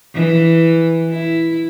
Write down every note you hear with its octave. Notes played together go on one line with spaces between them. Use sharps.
E3
E4